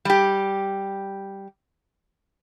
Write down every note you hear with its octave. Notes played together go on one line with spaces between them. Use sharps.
G3 G4